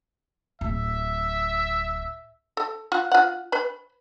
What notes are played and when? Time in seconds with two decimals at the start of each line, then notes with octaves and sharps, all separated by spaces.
0.61 D1 E5
2.57 A4
2.92 F4 F#5
3.12 F4 F#5
3.52 B4 B5